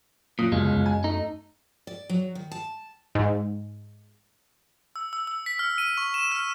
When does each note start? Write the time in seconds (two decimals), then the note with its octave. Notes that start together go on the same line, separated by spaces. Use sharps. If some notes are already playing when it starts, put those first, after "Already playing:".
0.39 F#2 A#2 D#6
0.52 G1 C#2 F#2 G#3
0.74 F#2
0.86 G#5
1.04 A3 D#4
1.87 D5
2.10 F#3
2.35 D#3
2.52 A5
3.15 G#2
4.96 E6
5.13 E6
5.27 E6
5.46 B6
5.59 F6
5.78 D#7
5.98 C#6
6.14 E7
6.32 F6